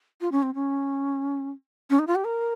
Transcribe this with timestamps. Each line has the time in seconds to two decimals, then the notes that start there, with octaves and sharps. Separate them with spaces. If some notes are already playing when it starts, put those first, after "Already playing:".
0.21 F4
0.32 C#4
0.43 C4
0.55 C#4
1.90 C#4
1.99 D#4
2.07 F4
2.15 G4
2.25 A#4